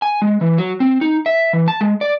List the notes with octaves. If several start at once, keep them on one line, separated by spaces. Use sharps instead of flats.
G#5
G#3
E3
F#3
C4
D#4
E5
E3
A5
G#3
D5